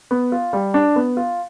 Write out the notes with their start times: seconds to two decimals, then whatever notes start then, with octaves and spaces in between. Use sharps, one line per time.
0.11 B3
0.32 F4
0.53 G3
0.74 D4
0.96 B3
1.17 F4